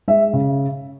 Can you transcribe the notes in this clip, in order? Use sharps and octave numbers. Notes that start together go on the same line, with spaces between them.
G#3 E5
C#3